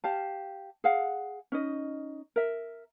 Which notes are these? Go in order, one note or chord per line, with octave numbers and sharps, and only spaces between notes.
G4 F5 A5
G#4 F5 F#5
C#4 D#4 D#5
A#4 E5